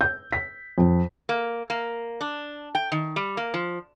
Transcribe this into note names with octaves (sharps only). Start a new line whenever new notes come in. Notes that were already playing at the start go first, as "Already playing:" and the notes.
G6
B6
F2
A#3
A#3
D4
G5
D#3
G3
A#3
F3